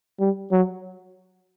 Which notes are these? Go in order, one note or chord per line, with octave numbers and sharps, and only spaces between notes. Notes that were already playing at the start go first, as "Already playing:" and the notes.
G3
F#3